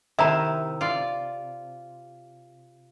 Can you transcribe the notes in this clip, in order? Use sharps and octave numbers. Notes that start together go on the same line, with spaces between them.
C3 D#3 E4 E5 A#5
F4 D5